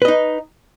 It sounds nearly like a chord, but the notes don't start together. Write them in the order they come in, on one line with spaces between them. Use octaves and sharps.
B4 D#5 D#4